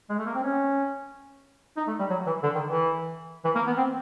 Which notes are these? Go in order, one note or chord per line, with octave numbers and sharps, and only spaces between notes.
G#3
A3
A#3
C4
C#4
D#4
A3
G3
F#3
E3
D3
D#3
E3
E3
A#3
B3
C4